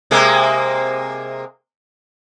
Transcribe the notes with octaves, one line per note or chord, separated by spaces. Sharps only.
C3 G#3 A#3